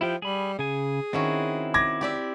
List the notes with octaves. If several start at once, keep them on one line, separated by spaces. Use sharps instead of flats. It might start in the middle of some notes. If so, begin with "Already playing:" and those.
F3 E4 G4 G5
G3 G#4 B5
C#3 G#4 G#5
D#3 C4 C#4 E4 F#4
D6 G#6 A#6
G4 D5 E5